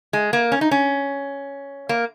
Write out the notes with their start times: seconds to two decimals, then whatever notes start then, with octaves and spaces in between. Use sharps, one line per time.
0.13 G#3
0.33 A#3
0.52 C#4
0.61 D#4
0.71 C#4
1.89 A#3